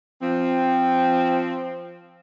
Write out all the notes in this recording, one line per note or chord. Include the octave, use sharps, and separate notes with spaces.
F3 C4